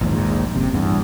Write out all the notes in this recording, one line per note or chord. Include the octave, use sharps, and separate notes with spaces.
A#1 D#2 G#2
F#1 C3
A1 E2 G2